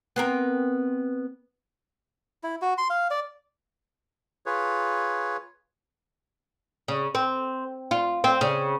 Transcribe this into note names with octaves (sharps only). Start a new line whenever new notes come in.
B3 C4 A#4
E4
F#4
C6
F5
D5
F4 G#4 B4 C#5
C#3
C4
F4
C4
C#3